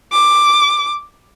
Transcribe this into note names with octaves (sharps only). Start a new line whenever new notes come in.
D6